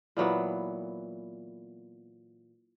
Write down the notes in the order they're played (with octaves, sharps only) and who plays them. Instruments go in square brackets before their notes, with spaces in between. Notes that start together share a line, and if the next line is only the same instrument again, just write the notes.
[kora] A#2 E3 F#3 B3